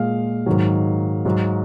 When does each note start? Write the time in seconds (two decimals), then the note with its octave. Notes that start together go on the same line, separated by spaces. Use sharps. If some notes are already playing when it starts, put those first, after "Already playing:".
Already playing: A#2 G#3 F5
0.46 G#2 D#3 F#3
1.25 G#2 F#3